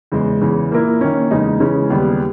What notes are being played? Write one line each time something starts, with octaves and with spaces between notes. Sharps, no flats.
E2 C#3 G#3
E2 C#3 E3
A#2 A#3 E4 A#4
D#3 A#3 C#4
E2 C#3 G#3 D#4 G#4
C#3 E3 G#3 C#4
D#2 C#3 G3 B3